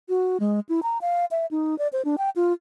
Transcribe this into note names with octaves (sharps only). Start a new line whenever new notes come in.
F#4
G#3
E4
A#5
F5
E5
D#4
D5
C5
D4
G5
F4